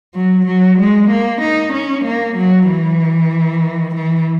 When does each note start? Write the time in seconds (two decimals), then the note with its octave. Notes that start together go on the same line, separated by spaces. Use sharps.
0.15 F#3
0.46 F#3
0.78 G#3
1.10 A#3
1.42 D#4
1.73 C#4
2.05 A#3
2.36 F#3
2.69 E3
3.96 E3